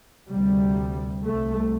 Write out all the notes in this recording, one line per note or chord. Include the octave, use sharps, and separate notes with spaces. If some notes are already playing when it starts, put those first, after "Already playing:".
D2 C3 G3
C2 C3 A3